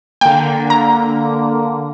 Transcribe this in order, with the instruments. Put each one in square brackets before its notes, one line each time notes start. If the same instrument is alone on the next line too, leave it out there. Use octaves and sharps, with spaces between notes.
[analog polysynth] D3 A#3 [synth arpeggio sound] G5
[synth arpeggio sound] A#5